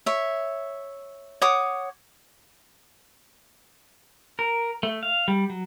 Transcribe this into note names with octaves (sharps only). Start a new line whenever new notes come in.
C#5 E5
C#5 F#5 D6 D#6
A#4
A3
F5
G3
F#3